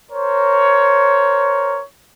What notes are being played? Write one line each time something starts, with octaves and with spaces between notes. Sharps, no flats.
A#4 C5 C#5